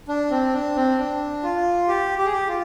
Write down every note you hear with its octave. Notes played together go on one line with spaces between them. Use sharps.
D4
C4
D4
C4
D4
F4
G4
G4
G#4
G4
F4